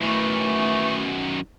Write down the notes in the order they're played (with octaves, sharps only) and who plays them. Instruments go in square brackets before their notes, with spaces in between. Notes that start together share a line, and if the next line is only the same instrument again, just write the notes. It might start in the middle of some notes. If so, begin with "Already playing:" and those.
[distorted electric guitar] F#2 D#3 [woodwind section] E3 A3